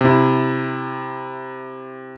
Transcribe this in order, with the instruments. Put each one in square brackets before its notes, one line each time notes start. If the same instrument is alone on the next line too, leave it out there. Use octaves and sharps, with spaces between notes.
[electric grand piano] C3 E4